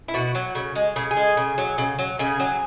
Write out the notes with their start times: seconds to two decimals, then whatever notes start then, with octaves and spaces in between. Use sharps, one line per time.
0.08 E4
0.14 B2 F#4
0.35 F#3
0.55 C#3
0.75 G#3
0.96 C#3 G#4
1.11 G#4
1.17 G#3
1.37 C#3
1.58 F#3
1.78 C#3
1.99 F#3
2.19 C#3 G#4
2.40 F#3